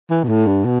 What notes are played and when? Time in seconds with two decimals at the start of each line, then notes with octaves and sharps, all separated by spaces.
0.10 E3
0.23 B2
0.28 A2
0.46 G2
0.65 B2